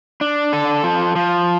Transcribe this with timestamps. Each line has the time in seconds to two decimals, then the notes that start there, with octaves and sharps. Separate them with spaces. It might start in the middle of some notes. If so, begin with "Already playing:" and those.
0.21 D4
0.53 A4
0.84 F3
1.16 F3